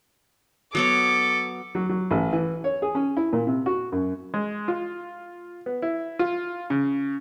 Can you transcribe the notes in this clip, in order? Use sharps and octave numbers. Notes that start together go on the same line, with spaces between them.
F#3 B3 A4 C#5 D6
F#3
F#3
A1
E3
C#5
G#4
C#4
E4
A#2
C3
F#4
F#2
G#3
F4
B3
E4
F4
C#3